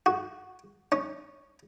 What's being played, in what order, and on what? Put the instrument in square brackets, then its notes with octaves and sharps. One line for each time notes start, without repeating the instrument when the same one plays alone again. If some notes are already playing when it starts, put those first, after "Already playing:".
[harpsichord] F#4
C#4